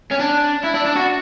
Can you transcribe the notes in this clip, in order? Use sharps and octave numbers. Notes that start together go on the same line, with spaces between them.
C#4
D4
E4
D4
D4
F#4